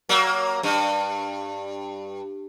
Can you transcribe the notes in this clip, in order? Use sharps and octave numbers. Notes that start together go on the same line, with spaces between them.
F#3 A#3
G2